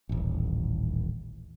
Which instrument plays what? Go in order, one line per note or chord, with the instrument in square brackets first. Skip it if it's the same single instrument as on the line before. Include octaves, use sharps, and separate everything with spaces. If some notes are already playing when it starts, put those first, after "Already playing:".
[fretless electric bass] D#1 A1